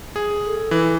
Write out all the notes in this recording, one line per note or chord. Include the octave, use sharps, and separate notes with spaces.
G#4
A4
E3